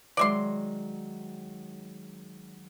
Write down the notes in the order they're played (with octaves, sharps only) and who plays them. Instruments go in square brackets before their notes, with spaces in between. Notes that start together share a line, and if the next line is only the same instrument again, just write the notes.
[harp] D#3 F#3 G#3 [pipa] D5 E5 C6